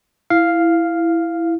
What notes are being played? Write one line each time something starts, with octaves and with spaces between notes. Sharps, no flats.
E4 F5